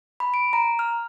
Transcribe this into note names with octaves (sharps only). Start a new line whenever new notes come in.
B5
D7
A#5
F6